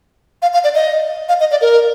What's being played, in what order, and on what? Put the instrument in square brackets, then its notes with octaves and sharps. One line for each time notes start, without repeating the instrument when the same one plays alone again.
[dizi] F5
F5
D5
D#5
F5
D#5
D5
A#4